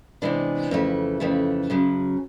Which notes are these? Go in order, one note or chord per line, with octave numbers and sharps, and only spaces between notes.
C3 E3 G#3 B3 D4
F2 C#3 E3 A3
F2 C#3 E3 A3
F#2 C#3 F#3